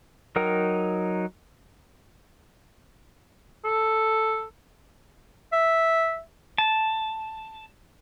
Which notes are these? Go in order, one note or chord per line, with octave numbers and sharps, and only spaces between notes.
F#3 D#4 A#4 G5
A4
E5
A5